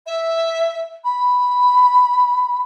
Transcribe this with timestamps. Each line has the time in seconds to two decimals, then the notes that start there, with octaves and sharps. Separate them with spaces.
0.06 E5
1.04 B5